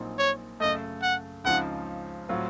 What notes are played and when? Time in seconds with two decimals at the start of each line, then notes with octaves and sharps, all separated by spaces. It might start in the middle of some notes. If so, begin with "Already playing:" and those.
Already playing: A#1 A#2 F#3 C4 D#4
0.18 C#5
0.60 F#2 C#3 A3 D#5
1.02 F#5
1.44 C#2 C#3 F3 C4 D#4 F#5
2.29 A2 F#3 C4 F4